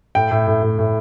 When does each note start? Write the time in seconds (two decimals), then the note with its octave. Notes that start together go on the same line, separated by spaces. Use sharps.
0.15 A2 G5
0.31 A2
0.47 A2
0.62 A2
0.79 A2